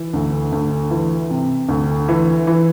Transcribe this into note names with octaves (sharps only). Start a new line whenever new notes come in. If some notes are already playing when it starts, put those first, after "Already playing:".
Already playing: E3
D2
D2
E3
C3
D2
E3
E3